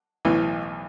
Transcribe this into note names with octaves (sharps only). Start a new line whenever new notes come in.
B1 A2 E3